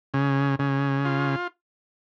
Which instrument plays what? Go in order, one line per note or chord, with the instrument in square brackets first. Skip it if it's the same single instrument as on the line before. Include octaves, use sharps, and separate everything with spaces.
[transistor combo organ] C#3
C#3
F4